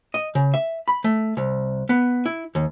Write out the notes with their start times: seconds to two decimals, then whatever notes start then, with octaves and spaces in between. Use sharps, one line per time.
0.14 D#5
0.35 C#3
0.54 E5
0.88 B5
1.04 A3
1.37 C2
1.89 B3
2.26 E4
2.55 D#2